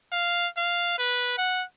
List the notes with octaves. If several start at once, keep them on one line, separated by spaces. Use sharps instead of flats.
F5
F5
B4
F#5